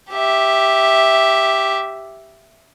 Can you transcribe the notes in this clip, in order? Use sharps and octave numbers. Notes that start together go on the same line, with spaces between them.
G4 E5